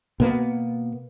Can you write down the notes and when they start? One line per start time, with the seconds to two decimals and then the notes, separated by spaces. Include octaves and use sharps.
0.20 B2 A#3 B3